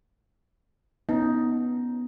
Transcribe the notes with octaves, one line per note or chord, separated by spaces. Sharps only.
B3 C#4 D#4